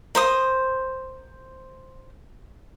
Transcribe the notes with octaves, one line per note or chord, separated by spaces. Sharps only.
A#4 C5 D#6